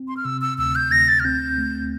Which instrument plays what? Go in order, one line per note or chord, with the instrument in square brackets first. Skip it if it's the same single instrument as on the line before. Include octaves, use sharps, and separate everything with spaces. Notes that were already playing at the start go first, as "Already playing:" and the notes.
Already playing: [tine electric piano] C4
[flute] C6
F6
[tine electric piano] C3 [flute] E6
[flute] E6
[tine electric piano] D2 [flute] E6
[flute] G6
[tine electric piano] D2 [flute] A#6
[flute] A6
F6
[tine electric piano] C4 [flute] G6
[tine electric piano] A3